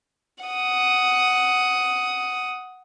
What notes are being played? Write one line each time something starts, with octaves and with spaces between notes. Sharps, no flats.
F#5 D#6